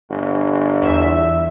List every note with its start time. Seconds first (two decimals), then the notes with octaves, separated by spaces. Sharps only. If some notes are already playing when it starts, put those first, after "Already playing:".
0.10 G1
0.82 E2 E5